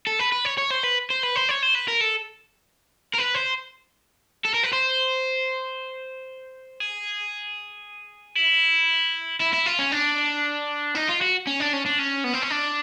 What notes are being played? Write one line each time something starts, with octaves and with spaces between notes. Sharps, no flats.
A4
B4
B4
C#5
C#5
C5
B4
C5
B4
C5
C#5
C5
B4
A#4
A4
A#4
B4
C5
A4
A#4
B4
C5
G#4
E4
E4
E4
F4
C#4
D4
D#4
F4
F#4
C#4
D4
C#4
D4
C#4
B3
C4
C#4
D4